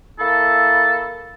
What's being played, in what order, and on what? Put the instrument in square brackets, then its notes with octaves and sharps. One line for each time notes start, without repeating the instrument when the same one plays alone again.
[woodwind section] A#3 E4 A4